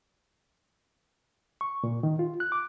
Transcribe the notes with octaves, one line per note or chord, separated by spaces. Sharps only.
C#6
A#2
D#3
F4
F#6
D6